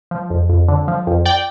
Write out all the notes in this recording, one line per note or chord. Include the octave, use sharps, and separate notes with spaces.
F3
F2
F2
D3
F3
F2
D5 G5